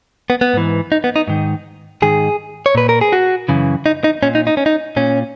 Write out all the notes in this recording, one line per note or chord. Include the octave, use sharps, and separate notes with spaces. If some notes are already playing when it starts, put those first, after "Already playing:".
B3
B3
G#2 E3
D#4
B3
D#4
G#2 D#3
G#2 D#3 G#4
C#5
A#2 B4
A#4
G#4
F#4
F#2 C#3 E3
D#4
D#4
A#2 C#4
D#4
D#4
C#4
D#4
A#2 C#4